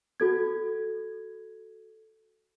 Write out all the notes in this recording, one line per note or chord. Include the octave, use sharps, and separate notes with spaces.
F#4 A4 G#6